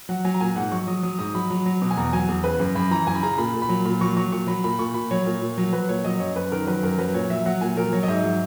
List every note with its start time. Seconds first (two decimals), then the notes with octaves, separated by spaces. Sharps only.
0.09 F#3 F#5
0.25 F#3 G#5
0.34 A#5
0.41 A#2 G#5
0.56 G#2 F#5
0.72 F#3 C#6
0.87 F#3 D#6
1.03 F#3 D#6
1.19 G#2 D#6
1.34 F#3 B5
1.50 F#3
1.66 F#3
1.82 B2
1.91 G#5
1.97 E2 A#5
2.13 F#3 G#5
2.28 E2
2.44 C#3 B4
2.60 F#2
2.75 F#2 B5
2.91 E3 A#5
3.07 F#2 G#5
3.15 B5
3.23 C#3 A#5
3.38 A#2 B5
3.54 A#2
3.62 B5
3.69 F#3
3.85 A#2 B5
4.01 F#3 C#6
4.17 F#3 C#6
4.32 A#2 C#6
4.47 F#3 B5
4.64 A#2 B5
4.79 A#2 C#6
4.94 A#2 B5
5.11 F#3 C#5
5.26 A#2
5.42 A#2
5.58 F#3
5.73 F#3 B4
5.89 A#2 C#5
6.04 F#3 D#5
6.20 F#2 C#5
6.35 F#2 B4
6.52 D#3 A#4
6.67 F#3 B4
6.83 F#2 A#4
6.98 F#3 B4
7.14 A#2 C#5
7.30 F#3 E5
7.46 F#3 F#5
7.61 A#2 G#5
7.77 F#3 A#4
7.93 F#3 C#5
8.03 D#5
8.08 G#2 E5
8.24 F#3